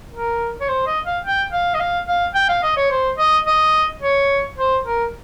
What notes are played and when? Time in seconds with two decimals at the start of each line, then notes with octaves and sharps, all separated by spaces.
0.12 A#4
0.61 C#5
0.69 C5
0.87 D#5
1.05 F5
1.24 G5
1.52 F5
1.74 D#5
1.80 F5
2.07 F5
2.34 G5
2.49 F5
2.63 D#5
2.77 C#5
2.91 C5
3.18 D#5
3.47 D#5
4.01 C#5
4.58 C5
4.85 A#4